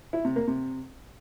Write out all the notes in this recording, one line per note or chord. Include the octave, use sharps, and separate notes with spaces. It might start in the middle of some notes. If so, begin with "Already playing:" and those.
E4
C3
A#3
C3